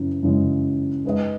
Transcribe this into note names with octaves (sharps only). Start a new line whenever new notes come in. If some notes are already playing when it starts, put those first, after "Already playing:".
Already playing: F#2 C#3 E3
F#2 C#3 E3 G#3
G#3 D#4 G#4 B4 D#5